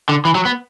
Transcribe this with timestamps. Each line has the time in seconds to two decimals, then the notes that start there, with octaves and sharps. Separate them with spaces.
0.09 D3
0.25 E3
0.35 F#3
0.45 B3